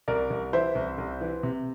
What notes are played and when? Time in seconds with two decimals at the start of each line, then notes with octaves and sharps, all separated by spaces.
0.08 C2 A#4 D5
0.30 C2
0.53 E3 C5 E5
0.75 C2
0.98 C2
1.21 E3
1.43 C3